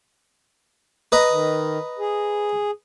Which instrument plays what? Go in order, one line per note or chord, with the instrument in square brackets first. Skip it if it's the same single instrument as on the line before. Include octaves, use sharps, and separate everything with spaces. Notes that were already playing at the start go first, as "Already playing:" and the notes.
[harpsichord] B4 D#5 A#5
[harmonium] D#3
G#4